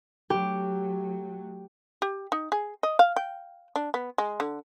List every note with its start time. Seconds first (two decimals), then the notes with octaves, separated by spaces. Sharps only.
0.30 F#3 A3 G4
2.02 G4
2.32 D#4
2.52 G#4
2.83 D#5
2.99 F5
3.16 G5
3.76 D4
3.94 B3
4.18 G#3
4.40 D3